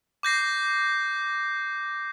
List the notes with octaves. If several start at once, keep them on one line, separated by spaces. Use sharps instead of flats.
D6 G6 A#6 C7